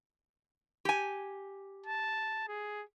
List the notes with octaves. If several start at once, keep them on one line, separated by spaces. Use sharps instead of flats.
G4 G#5
A5
G#4